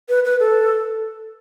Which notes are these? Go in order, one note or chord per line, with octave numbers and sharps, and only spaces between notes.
B4
B4
A4